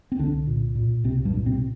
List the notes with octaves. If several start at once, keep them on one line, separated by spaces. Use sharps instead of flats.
C4
C2 D3 D4
A#2
A#2
C2 C3 C4
G2 G3
A#2
C3 C4